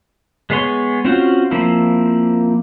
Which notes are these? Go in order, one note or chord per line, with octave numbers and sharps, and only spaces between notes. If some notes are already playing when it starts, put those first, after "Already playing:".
G#3 B3 G#4 C#5 C6
C4 C#4 F4 F#4 C5
F3 A#3 C4 E4